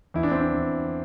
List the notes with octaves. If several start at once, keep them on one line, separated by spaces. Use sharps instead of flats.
E2 E4
D4
C4
D4
E2